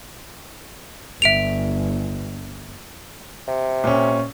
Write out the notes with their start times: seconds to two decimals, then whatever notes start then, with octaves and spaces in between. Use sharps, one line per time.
1.22 G1 E5 D7 F7
3.48 C3
3.84 A#2 C#4